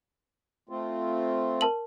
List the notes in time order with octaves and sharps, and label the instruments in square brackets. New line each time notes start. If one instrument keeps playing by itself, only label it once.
[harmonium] A3 C4 F4
[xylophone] A#4 A5 F#7